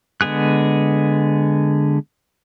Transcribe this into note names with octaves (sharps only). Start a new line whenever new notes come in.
D3 G#3 B3 G#4 F#6